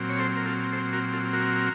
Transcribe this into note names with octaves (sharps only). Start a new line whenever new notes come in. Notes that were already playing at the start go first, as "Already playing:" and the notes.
Already playing: A#2 F#3 C4
C#5
A4 C5
A#4
F4 A4
A4 C5
F#4 A#4
F4 A4
F#4 A#4